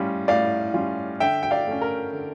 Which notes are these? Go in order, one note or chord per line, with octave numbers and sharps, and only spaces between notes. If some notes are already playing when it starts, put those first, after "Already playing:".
Already playing: A2 G3 C#4 F4
A2 D5 F5
G3 C#4 F4
D3 E5 G5
G5
D5 F5
A3 C#4
A#4
D3